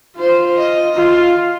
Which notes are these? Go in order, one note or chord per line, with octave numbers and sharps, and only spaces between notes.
F4 C5
D#5
F4